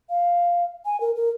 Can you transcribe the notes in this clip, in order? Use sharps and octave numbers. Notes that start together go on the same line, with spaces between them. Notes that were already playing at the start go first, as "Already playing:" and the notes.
F5
G#5
A#4
A#4